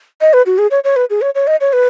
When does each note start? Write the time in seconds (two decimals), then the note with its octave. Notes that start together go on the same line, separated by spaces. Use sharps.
0.21 D#5
0.33 B4
0.46 F#4
0.58 G#4
0.71 C#5
0.84 C#5
0.96 B4
1.10 G#4
1.22 C#5
1.35 C#5
1.47 D#5
1.61 C#5
1.73 B4